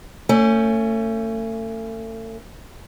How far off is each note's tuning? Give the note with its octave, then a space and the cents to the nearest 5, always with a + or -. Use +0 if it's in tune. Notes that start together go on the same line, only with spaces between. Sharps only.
A3 +35 C#4 +0